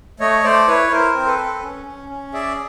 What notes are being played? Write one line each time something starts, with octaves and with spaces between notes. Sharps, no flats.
A3 C#5 D#5
A3 C5 D5
E4 B4 C#5
E4 A#4 C5
C4
A4 B4
C4
C#4
C#4
C#4
G#4 D5 E5